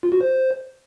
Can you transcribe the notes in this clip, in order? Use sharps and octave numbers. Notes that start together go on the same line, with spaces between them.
F4
F#4
C5